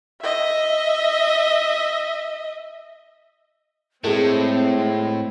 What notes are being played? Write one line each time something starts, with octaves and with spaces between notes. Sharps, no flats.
D#5 E5
A2 G#3 C4 G#4 A4